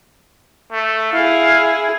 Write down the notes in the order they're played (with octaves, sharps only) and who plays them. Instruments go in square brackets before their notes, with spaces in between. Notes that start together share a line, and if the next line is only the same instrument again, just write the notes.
[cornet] A3
[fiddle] E4 G#4 [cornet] F5